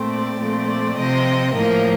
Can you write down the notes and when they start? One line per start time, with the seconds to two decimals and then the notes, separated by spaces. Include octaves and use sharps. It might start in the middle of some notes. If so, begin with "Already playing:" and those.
Already playing: A#2 A3 C4
0.09 D5
0.38 A#2 F3 A3 C4
0.67 D5
0.96 C3 F3 C4 D#5
1.54 A2 F3 A#3 D#5